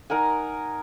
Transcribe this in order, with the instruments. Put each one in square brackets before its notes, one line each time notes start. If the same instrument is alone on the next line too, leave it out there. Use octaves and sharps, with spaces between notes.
[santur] D#4 A#4 F#5 G#5